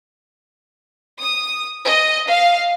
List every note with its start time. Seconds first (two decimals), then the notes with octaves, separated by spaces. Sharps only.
1.20 D#6
1.87 D#5
2.29 F5